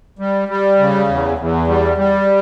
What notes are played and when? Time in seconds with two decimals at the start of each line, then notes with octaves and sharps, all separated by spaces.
0.19 G3
0.48 G3
0.79 C#3
1.08 E2
1.38 E2
1.68 G3
1.98 G3